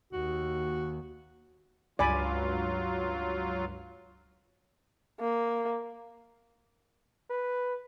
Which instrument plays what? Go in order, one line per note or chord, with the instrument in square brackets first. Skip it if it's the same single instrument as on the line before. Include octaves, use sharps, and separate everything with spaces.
[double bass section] D#2 [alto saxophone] F#4
[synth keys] C#2 G2 D6 [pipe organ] F#3 F4 [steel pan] D5 G#5 B5
[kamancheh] A#3
[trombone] B4